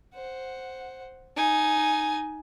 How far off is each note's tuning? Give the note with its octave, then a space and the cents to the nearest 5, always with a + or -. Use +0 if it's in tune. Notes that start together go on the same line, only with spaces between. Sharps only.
C5 +5 F#5 +0
D#4 +0 G#5 +10